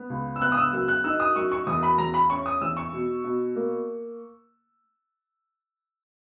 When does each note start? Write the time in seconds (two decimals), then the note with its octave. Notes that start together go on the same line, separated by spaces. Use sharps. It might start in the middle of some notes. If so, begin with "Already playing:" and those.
Already playing: B3
0.10 C#2
0.36 E6
0.41 B3 F#6
0.52 D#6
0.57 E6
0.73 F#2 E6
0.88 F#6
1.04 D#4 E6
1.20 D#6
1.36 F#2 C#6
1.52 C#6
1.67 E2 D#6
1.83 B5
1.98 E2 A#5
2.14 B5
2.30 C#4 C#6
2.46 D#6
2.61 E2 E6
2.77 C#6
2.93 B2
3.24 B2
3.56 A#3